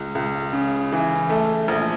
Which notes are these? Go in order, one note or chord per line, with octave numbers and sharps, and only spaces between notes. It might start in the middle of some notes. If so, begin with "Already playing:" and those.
Already playing: C#2
C#2
C#3
E3
A3
A#1